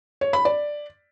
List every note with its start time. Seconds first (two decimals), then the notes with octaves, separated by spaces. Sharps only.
0.21 C#5
0.33 B5
0.45 D5